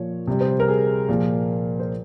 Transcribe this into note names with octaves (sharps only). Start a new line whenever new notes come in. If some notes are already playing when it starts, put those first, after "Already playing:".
Already playing: A#2 F3 C#5
C3 G3
C5
A#4
G#4
A#2 F3
C5